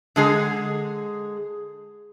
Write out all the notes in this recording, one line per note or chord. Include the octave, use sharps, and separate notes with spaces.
D3 G#3 G#4